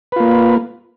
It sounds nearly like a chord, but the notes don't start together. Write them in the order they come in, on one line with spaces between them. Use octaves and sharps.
B4 F4 A#3